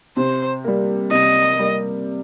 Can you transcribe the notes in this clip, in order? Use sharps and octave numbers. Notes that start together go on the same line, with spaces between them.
C3 C5
G3 A#3
C3 D#5
G3 A#3